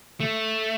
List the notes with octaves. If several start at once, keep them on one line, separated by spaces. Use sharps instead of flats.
A3